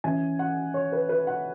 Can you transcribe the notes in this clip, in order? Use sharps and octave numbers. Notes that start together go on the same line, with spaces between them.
E3 C#4 G#5
F#5
C#5
B4
B4
F#5